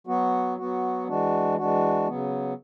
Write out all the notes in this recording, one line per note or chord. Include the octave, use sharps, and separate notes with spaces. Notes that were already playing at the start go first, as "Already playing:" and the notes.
F#3 B3 F#4
F#3 B3 F#4
E3 G#3 D4 F#4
E3 G#3 D4 F#4
C#3 F#3 B3